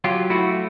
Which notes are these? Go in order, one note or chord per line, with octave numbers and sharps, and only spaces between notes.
F#3 F4 G4
A3 E4 F#4